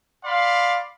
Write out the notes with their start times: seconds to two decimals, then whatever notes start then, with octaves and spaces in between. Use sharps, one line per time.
0.24 D5 F5 B5 C6